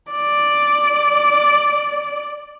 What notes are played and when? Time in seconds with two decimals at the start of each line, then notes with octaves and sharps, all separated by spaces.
0.11 D5